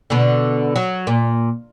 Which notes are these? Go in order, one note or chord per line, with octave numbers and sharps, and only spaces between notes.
B2 D3
F#3
A#2